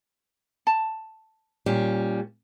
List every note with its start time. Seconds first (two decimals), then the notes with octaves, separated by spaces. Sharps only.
0.67 A5
1.66 A#2 G3 C#4